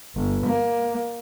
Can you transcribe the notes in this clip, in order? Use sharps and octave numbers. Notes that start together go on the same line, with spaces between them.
G1
A#3